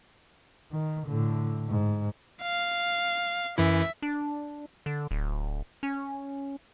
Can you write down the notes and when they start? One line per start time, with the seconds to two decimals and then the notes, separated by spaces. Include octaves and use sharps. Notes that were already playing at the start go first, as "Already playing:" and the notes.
0.72 D#3
1.08 A2 D3
1.69 G#2
2.42 F5
3.58 F#2 E3 E4 E5
4.02 D4
4.86 D3
5.11 D1
5.83 C#4